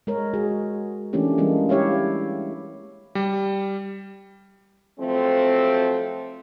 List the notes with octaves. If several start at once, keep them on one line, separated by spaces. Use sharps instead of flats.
G#3 A#4 C#5
G#3 F#4 G#4
E3 A3 A#3 C#4 D4 G4
E3 G3 G#3 A#3
E4 G4 C#5 E5 F5
G3
F3 F#3 A3 C4